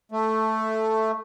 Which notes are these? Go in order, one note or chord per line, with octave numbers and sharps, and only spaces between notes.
A3